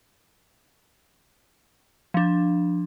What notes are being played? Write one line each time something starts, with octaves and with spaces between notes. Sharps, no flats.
F3 D4